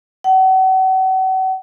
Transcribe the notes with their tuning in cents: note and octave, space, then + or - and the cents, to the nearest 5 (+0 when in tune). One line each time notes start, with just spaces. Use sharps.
F#5 +40